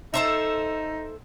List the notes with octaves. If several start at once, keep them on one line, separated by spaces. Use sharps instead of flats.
D#4 A4 C5 E5